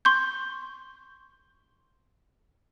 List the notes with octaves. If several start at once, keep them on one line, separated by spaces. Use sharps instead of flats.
C6 C#6 G6